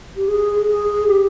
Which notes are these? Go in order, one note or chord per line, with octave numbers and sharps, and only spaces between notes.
G4
G#4
G#4
G4